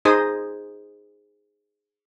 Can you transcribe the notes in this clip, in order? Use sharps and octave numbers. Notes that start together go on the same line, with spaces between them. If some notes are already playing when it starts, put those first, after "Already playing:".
D#4 G#4 C5 D#6